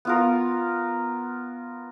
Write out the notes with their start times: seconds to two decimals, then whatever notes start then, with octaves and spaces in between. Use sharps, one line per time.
0.05 B3 F4 A#4